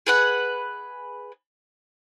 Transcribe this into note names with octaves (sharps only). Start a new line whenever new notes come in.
G#4 B4 F#5